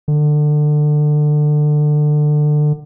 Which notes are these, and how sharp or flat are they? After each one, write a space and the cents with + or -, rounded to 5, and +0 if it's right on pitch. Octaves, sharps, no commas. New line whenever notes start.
D3 +25